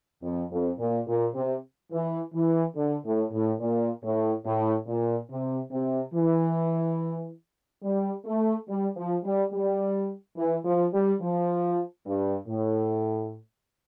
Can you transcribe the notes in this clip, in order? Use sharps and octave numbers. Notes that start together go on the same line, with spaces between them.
F2
F2
A#2
A#2
C3
E3
E3
D3
A2
A2
A#2
A2
A2
A#2
C3
C3
E3
G3
A3
G3
F3
G3
G3
E3
F3
G3
F3
G2
A2